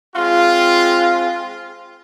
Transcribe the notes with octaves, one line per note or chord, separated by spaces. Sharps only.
G#3 C4 F4